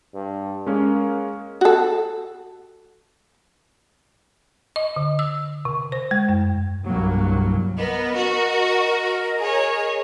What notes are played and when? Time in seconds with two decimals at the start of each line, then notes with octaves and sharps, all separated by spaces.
0.14 G2
0.67 G#3 A#3 C#4
1.61 F#4 A4
4.76 D#5
4.96 D3
5.19 E6
5.65 C3
5.92 C5
6.11 G#3
6.29 F#2
6.84 C2 G2 F#3 A#3
7.78 B3 A#4 D#5
8.16 F#4
9.39 G#4 C#5